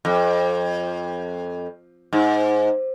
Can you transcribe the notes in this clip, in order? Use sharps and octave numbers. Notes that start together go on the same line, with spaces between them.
F2
G#2